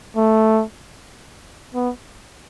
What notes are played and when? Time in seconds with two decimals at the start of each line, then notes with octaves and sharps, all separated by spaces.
0.16 A3
1.75 B3